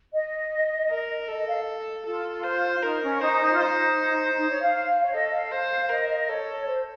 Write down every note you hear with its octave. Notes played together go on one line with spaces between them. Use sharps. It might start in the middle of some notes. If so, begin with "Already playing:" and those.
D#5
A#4
A4 D#5
D#5
F5
F4 A4
C5
D#4 A#4
C#4
D#4 C5
D#4
F4
D#4 C5
D#4
C#5
F5
C#5
A4 D#5
F5
C5
A#4 D#5
D#5
A4 C#5
C5